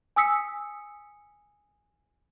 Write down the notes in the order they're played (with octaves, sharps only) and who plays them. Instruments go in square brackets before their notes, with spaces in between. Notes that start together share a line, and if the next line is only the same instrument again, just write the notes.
[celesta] G#5 D#6 E6 B6 C#7